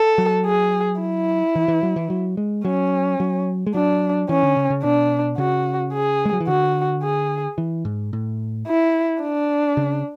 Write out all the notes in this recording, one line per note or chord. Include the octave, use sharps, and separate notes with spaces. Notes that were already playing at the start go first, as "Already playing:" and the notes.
Already playing: A4
F#3
G#4
E4
E3
E3
F#3
E3
F#3
G#3
F#3 C#4
F#3
G#3
F#3 D4
E3 C#4
D3
C#3
C#3
B2 D4
C#3 F#4
G#4
G#3
F#3
E3
D3 F#4
G#4
E3
G#2
A2
E4
D4
C#3